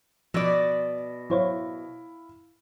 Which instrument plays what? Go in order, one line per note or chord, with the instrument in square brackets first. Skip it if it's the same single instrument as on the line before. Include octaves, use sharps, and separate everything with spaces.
[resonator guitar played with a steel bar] B2 D5 [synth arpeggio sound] F3 [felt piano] E6
[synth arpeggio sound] F#3 C5 C#5 [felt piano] E4 F5